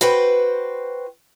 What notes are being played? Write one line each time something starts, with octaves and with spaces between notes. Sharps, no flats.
F#4 B4 C5 G5